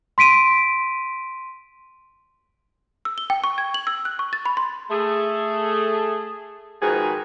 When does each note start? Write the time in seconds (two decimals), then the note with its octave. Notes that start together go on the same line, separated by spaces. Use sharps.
0.18 C6 B6 D7 D#7
3.05 E6
3.18 G7
3.30 G5
3.44 C#6
3.58 G#6
3.74 F#7
3.87 E6
4.05 F#6
4.19 C#6
4.33 A6
4.46 B5
4.57 C6
4.91 A3 G#4
6.81 G#2 D#3 F3 F#4 G#4 B4